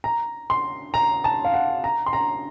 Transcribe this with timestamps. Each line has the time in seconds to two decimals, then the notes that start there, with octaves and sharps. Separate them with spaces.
0.04 A#5
0.50 C6
0.94 A#5
1.24 A5
1.45 F5
1.54 F#5
1.84 A#5
2.06 C6
2.13 A#5